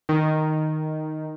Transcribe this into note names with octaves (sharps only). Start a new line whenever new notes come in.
D#3